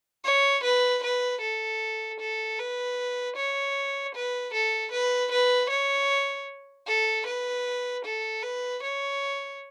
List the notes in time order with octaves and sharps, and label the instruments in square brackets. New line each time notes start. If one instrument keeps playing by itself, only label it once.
[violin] C#5
B4
B4
A4
A4
B4
C#5
B4
A4
B4
B4
C#5
A4
B4
A4
B4
C#5